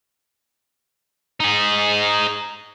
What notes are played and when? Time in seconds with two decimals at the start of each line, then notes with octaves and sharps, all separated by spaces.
1.40 D#4 G#4